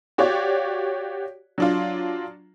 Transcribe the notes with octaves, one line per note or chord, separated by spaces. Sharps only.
F#4 G4 C#5 D5 F5
F#3 D4 F4